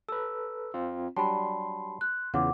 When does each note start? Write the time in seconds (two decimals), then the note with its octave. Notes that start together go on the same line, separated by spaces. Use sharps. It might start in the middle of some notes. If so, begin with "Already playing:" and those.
0.09 A4 B4 E6
0.74 C4 F4
1.17 F#3 G3 D4 A5 B5 C6
2.01 F#6
2.34 E2 C#3 F4 F#5 D6